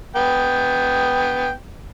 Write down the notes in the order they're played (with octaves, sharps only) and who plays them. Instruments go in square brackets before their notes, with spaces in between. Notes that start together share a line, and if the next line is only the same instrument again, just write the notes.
[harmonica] B3 G5